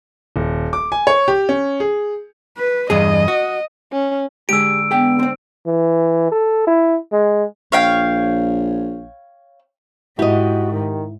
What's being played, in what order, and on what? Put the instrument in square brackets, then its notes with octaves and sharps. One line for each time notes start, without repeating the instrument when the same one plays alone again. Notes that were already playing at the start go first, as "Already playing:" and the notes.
[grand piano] D#1
D6
G#5
C#5
G4
C#4
G#4
[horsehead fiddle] B4
[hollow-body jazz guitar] E2 G2 G#4 [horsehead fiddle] D#5
[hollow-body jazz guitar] F#4
[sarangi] C#4
[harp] G#2 D3 G#3 [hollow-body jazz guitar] G4 G#4 [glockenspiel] E6 D7
[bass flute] B3 [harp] D4 [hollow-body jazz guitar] G#4 G5
[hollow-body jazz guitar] C4 C5
[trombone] E3
A4
E4
G#3
[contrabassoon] A#1 [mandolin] C#5 F5 G5
[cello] G#2 [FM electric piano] E4 [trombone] F#4 [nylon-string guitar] G4 D#5
[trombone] D#3